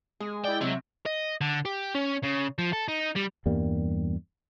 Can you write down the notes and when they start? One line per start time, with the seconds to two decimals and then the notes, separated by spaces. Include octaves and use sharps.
0.20 G#3 G#4
0.44 E4 D5 G5
0.61 C3 F#3 F#4 E5
1.06 D#5
1.41 D3
1.65 G4
1.95 C#4
2.24 C#3
2.59 F3
2.73 A4
2.88 D#4
3.16 G3
3.46 E2 G2 G3 A#3